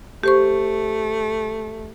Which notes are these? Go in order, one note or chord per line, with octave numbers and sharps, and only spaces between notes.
A3 G4 C5 C#6